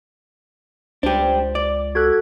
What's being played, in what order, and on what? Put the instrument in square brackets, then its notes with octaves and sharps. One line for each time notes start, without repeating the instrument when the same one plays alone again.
[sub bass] C#2 [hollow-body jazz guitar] D4 G4 [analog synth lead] C5
[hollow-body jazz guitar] D5 [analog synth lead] D6
[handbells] F#4 A4 F#6 [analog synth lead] G#6